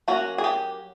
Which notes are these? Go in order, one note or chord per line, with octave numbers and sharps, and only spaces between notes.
F#3 A#3 C#4 F#4
G#4
G4